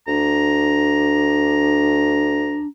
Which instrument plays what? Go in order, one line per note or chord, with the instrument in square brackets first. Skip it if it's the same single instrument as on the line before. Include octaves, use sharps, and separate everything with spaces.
[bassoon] D2 [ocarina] D4 [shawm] A#5